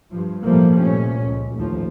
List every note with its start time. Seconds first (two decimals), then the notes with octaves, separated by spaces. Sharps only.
0.11 G2 F3
0.43 B1 A2 F3 G3 A3 A#3
0.82 C2 A#2 C#4
1.26 C#2
1.55 A1 D#2 F3